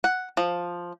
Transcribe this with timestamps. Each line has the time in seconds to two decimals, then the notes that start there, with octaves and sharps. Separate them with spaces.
0.04 F#5
0.37 F3